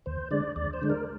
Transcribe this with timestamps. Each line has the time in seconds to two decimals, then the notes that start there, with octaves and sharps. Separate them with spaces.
0.06 D#2 C5
0.31 D3 G#3 D4 D5
0.56 D#2 D5
0.73 C5
0.82 D3 G#3 D4
0.90 A#4